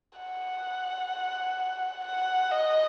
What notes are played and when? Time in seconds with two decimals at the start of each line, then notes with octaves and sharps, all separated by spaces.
0.19 F#5
2.05 F#5
2.51 D#5